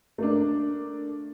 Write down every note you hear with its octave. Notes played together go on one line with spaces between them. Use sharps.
A3 A#3 D4